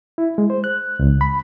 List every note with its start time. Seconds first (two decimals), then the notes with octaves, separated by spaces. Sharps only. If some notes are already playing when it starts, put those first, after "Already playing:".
0.18 E4
0.38 G#3
0.50 C5
0.64 F#6
0.99 C#2
1.21 B5